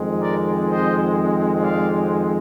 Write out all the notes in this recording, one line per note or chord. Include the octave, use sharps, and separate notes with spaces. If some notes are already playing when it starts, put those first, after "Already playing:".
Already playing: F2 D#3 G#3 C4
A#4 D5
C5 D#5
D5 F5